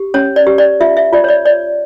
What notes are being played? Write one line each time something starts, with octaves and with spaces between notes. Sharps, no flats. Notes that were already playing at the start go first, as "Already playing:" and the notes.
Already playing: G4
C#4 C#5
D5
G4
D5
F4 E5
E5
F4 D5
C#5
D5
C#5 D5